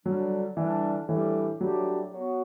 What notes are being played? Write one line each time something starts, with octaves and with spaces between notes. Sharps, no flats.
D3 F#3 G3 D4
D3 E3 G3 D4
A2 E3 G3 D4 G4
A2 F#3 G3 D4 G4
F#3 B3 F#4